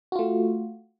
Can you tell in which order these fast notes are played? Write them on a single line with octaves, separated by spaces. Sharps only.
F#4 F4 A3